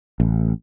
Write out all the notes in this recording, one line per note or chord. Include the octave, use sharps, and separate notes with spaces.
A1